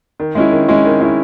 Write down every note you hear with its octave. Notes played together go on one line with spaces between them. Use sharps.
D#3
G#3 C#4 E4
D#3
G#3 C#4 E4
D#3
G#3 C#4 E4